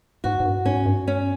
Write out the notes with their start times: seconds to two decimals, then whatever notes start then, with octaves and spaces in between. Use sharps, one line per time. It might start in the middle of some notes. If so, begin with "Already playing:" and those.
0.24 G#2 F#4
0.40 G#2
0.45 G2
0.65 G#2 C#4
0.86 G2
1.08 C#4